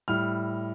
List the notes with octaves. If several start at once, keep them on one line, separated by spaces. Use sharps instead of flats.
A2 G3 F6